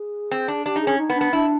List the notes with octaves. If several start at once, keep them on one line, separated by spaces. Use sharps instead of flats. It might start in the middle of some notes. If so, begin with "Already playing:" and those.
Already playing: G#4
C4
D4
D4 G4
D#4
G#4
C#4
D#4
B3
D4
B3
D4 E4